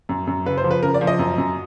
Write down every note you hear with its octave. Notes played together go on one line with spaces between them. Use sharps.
F#2
F#2
C#3 B4
C5
F3
B4
C#3 A#4
D5
F3
D#5
F#2
F#2